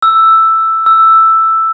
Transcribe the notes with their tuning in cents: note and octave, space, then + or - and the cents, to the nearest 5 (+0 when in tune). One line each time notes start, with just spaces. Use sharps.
E6 +5
E6 +5